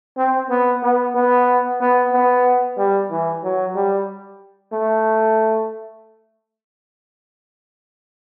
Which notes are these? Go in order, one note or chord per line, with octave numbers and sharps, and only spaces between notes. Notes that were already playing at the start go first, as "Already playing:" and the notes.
C4
B3
B3
B3
B3
B3
G3
E3
F#3
G3
A3